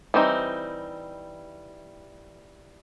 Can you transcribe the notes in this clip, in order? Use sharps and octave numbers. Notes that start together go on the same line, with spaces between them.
E3 G3 C4 D#4